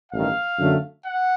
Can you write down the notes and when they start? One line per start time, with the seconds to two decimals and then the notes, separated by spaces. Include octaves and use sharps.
0.12 A1 G2 D#3 F5
0.59 F#2 D3 F#3 A3
1.06 F#5